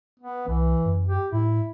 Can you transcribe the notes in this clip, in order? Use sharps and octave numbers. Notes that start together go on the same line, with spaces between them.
B3
C2 E3
F#2
G4
A2 E4